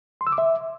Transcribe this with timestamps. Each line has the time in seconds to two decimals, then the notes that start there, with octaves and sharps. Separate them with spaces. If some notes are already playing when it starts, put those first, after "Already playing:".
0.21 C6
0.27 E6
0.32 D6
0.38 E5